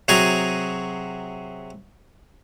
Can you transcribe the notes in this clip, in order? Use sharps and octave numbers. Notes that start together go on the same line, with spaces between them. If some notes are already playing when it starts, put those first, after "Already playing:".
C3 F#3 F#4 G#4 G#5 A#5